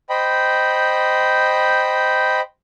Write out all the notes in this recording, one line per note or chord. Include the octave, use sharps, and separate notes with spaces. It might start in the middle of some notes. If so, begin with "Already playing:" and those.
C5 D#5 G5 B5